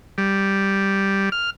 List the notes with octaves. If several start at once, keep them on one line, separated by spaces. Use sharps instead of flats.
G3
F6